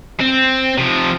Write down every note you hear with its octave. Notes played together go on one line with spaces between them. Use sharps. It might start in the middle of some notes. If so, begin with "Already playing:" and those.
C4
C3 F3